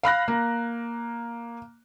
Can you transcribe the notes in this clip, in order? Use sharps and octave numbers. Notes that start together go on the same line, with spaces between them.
F5 B5 F#6 A#6
A#3